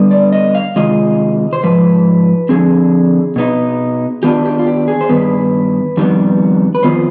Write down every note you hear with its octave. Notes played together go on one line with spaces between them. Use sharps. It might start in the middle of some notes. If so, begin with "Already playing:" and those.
Already playing: D3 G3 B3
D5
D#5
F5
C3 D#3 G#3 F4 D#5
C5
G#2 F3 B4
D3 F3 C4 G#4
B2 B3 D#4
D#3 B3 D4 F4 G4
G4
F4
G4
G#4
C5
G2 D#3 B3 B4
F2 D#3 G3 B3
B4
F2 D#3 B3 F4 C5